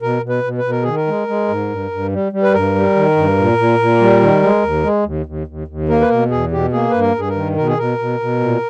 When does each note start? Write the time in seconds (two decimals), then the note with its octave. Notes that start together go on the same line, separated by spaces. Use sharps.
0.02 B2 A#4
0.23 B2
0.29 B4
0.44 B2
0.58 B4
0.64 B2
0.71 A#4
0.83 D#3 G#4
0.96 A#4
1.07 G#3
1.28 G#3
1.48 G#2
1.69 G2
1.91 G2
2.12 G3
2.32 G3
2.43 B4
2.53 G2 A#4
2.75 G3
2.95 D#3
3.17 G2
3.38 A#2
3.58 A#2
3.79 A#2
4.00 G3
4.21 D#3
4.43 G#3
4.62 D#2
4.83 G#3
5.05 D#2
5.26 D#2
5.47 D#2
5.67 D#2
5.89 A#3 A#4
6.01 B4
6.09 B2 A#4
6.30 E2 G#4
6.51 B2 G4
6.72 A#3 G#4
6.90 G2 B4
7.01 A#4
7.15 G2 G#4
7.29 A#4
7.35 D#3
7.56 B2 A#4
7.67 G#4
7.78 B2 A#4
7.98 B2
8.20 B2
8.40 A#2